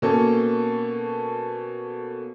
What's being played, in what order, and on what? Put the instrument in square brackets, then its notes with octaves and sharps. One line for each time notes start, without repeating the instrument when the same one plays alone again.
[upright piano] B2 A#3 C#4 A4